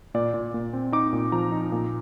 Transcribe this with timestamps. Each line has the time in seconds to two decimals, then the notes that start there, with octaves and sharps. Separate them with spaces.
0.14 A#2 D5
0.34 A#2
0.54 A#2
0.73 C4
0.92 D#4 D6
1.13 A#2
1.32 F3 A#5
1.52 D#4
1.72 A#2